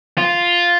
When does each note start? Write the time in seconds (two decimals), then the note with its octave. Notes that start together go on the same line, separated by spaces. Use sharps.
0.18 F4